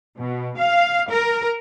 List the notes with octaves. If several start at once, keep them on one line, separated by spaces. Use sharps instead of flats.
B2
F5
A#4